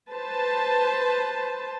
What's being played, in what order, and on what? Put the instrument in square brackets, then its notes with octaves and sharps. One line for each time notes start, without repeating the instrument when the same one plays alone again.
[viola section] B4 C5 A5